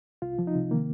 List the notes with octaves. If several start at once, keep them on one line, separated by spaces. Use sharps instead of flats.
C2 F4
F3
D#4
C3
D#3 A#3